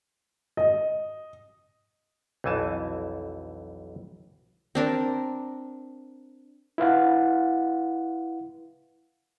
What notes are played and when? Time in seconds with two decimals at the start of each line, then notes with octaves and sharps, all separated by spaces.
0.57 D#5
2.44 B1 F2 E3 G#5 A5
4.75 C4 D4 A#4
6.78 E4 B4 F5 F#5